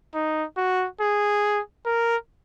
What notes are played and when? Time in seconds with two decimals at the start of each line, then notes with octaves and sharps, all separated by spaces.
0.15 D#4
0.57 F#4
1.00 G#4
1.86 A#4